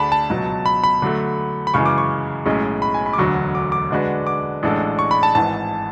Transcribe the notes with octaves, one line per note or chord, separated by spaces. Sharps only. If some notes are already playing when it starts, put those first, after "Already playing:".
Already playing: D2 D3 A3 D4 G#4 A5 B5
A5
C#2 B2 F#3
B5
B5
D3 F#3 A3
B5
F#2 C#3 E3 G#3 C#6
D6
C#6
B1 A2 G#3 C#4 G#4
B5
G#5
B5
D6
E1 D2 D3 F#3 C#6
D6
D6
D3 G#3 D4 F#4 B4
D6
A1 A2 G#3 D4 A4
C#6
B5
A5
G#1 G#2 E3 A5